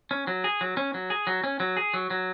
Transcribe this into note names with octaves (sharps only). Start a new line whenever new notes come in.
C#4
F#3
G#4
F#3
C#4
F#3
G#4
F#3
C#4
F#3
G#4
F#3
F#3